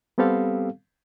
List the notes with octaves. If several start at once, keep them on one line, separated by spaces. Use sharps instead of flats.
G3 B3 C4 G4 A4 F5